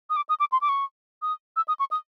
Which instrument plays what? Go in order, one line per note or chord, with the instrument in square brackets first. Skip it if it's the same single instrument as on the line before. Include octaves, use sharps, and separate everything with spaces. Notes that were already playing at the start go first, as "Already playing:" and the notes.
[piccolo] D#6
D6
D#6
D6
C6
D6
C#6
D#6
E6
D#6
C#6
D#6